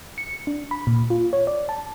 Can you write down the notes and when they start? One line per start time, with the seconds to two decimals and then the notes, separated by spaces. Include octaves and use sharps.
0.18 C#7
0.47 D4
0.71 B5
0.87 A#2
1.10 F4
1.33 C#5
1.47 D5
1.69 A5